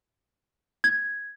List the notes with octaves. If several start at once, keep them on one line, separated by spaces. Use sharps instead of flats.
G#6